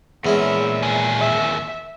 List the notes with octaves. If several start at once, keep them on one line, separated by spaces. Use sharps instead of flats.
E2 A#2 G#3 C#4 E5 B5
D#2 G#4
E5